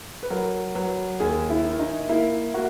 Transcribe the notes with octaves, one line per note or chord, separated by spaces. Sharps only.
B4
F#3 A#4
F#3 B4
D#2 G#4
E4
D#3
D#4
A#3 E4
A#3 F#4